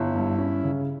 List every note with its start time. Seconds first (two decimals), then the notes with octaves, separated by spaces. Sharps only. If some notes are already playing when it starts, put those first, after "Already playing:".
Already playing: G1 E4
0.15 G2
0.39 C#4
0.64 C#3